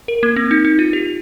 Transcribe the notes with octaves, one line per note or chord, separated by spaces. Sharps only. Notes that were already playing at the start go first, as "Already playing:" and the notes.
A#4
A#3
C4
D#4
D#4
F4
G4